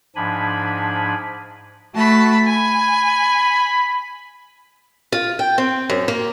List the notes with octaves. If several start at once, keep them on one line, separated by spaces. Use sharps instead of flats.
G#2 F3 D4 G#5 B5
A3 F#4 A5 B5
G#5 B5
F4
G5
C4
F#2
A#3